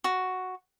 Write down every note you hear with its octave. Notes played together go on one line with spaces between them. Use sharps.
F#4